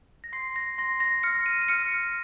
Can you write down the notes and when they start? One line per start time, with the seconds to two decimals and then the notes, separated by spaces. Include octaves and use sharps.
0.24 A#6
0.33 C6 C7
0.56 A#6
0.78 C6 A#6
1.00 A#6
1.23 F6 C#7
1.46 D#7
1.62 D#7
1.68 F6 C#7
1.92 C#7